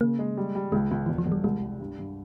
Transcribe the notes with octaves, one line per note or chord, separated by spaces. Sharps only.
C#3 A#3
G#3
G3
G3
C#2 G#3
C#2
E1 E3
F3
E1
G3
C2 G#3
G3
G2
G2